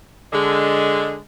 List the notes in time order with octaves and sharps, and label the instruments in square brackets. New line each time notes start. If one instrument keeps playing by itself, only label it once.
[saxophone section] D3 G#3